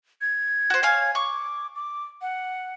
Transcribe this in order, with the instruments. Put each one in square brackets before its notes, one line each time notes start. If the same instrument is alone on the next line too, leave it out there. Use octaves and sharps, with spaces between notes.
[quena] G#6
[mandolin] F#4 C5
C#5 F5 G#5
[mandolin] C#6 [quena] D6
[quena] D6
F#5